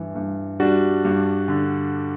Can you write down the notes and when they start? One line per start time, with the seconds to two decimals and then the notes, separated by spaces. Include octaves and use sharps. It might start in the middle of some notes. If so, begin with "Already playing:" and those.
Already playing: G2 E3
0.15 G2
0.60 G3 D4 F#4
1.05 G2
1.48 D3